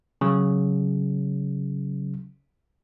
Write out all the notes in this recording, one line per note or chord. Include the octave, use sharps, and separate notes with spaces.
C#3 F#3